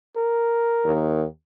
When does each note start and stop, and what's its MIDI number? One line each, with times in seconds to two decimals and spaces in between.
0.17 1.16 70
0.85 1.24 39